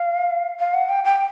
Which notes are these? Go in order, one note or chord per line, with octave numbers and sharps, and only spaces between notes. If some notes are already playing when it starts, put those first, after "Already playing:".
Already playing: F5
F5
F#5
G5
G5